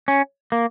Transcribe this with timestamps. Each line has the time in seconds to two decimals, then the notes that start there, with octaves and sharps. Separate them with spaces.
0.08 C#4
0.52 A#3